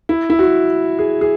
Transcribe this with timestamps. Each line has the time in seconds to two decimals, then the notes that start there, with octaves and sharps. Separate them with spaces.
0.09 E4
0.30 E4
0.39 F#4
0.99 G#4
1.21 G#4